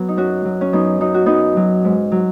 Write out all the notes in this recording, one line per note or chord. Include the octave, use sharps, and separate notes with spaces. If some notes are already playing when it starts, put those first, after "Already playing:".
Already playing: F#3 B3
D#4
F#2 C#4 F#4
F#3
C#4
F#2 B3 D#4
F#3 D#4
F#4
F#2 B3 D#4
F#3
G#2
F#3